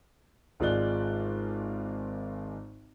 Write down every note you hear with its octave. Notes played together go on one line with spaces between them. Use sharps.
G#1 G#3 F4 D5 F#6 G7